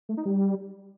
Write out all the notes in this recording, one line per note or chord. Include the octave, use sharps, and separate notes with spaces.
A3
D#4
G3